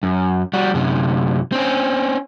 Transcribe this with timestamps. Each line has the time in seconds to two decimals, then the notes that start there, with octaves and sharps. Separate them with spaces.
0.03 F#2
0.53 G3 F#4
0.74 F#2 C3
1.52 C4 C#4